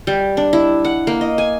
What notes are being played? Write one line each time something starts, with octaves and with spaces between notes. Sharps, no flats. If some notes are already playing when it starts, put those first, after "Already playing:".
G3
D4
E4
F#5
A#3
D#5
G#5